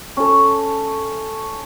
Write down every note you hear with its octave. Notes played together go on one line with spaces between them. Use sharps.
C#4 A4